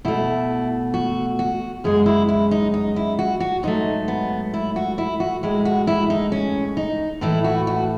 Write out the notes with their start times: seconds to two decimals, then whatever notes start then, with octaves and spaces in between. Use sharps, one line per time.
0.05 B2 A3 E4
0.94 F#4
1.39 F#4
1.84 F#2 C#3 G#3 G#4
2.06 E4
2.29 E4
2.51 D#4
2.74 D#4
2.96 E4
3.19 F#4
3.40 F#4
3.63 G#2 F#3 A3 D#4
4.08 B3
4.54 E4
4.76 F#4
4.98 E4
5.20 F#4
5.43 A2 G#3 E4
5.65 F#4
5.87 E4
6.10 D#4
6.32 C#4
6.77 D#4
7.21 A2 E3 A3 E4
7.44 F#4
7.67 F#4